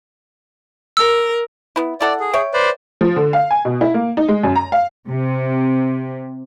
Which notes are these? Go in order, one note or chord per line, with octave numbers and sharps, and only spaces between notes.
A#4 E6
B3 E4
E4 A4 D5 F#5
G#4
C#5 E5 G5
B4 C5 D5
F3
D3
F5
G#5
B2
E4
A#3
D#4
G#3
F#2
A#5
F5
C3